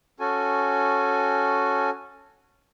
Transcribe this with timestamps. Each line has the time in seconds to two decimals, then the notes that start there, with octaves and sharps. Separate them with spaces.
0.20 C#4 F#4 A4 G#5